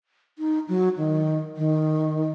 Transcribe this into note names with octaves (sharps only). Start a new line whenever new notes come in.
D#4
F#3
D#3
D#3